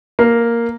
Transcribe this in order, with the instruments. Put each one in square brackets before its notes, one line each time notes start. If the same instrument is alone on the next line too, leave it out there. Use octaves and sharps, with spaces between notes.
[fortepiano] A#3